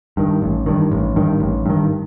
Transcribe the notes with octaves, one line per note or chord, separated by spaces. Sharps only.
G2 D#3
A1
G2 D#3
A1
G2 D#3
A1
G2 D#3